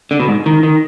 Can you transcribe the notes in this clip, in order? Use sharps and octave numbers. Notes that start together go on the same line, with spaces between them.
D3
B2
G#2
D#3
D#3